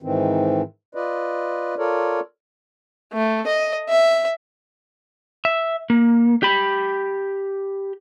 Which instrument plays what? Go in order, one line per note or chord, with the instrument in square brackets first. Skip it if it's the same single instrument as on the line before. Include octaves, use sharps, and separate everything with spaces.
[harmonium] G#2 D#3 E3 C4
F4 B4 D5 D#5
F4 A4 A#4 C#5 D5
[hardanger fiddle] A3
D#5
E5
[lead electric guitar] E5
A#3
G4 B5